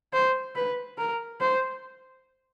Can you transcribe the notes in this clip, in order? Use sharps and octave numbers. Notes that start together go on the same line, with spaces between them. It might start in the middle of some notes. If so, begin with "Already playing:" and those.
C5
B4
A#4
C5